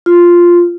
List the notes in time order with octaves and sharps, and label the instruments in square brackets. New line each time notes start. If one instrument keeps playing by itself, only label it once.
[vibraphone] F4